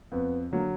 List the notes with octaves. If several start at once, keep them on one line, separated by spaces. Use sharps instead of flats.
F2 B3
D3 F#3 A#3